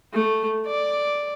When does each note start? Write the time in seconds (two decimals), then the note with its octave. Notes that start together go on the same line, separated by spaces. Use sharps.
0.13 A3
0.67 D5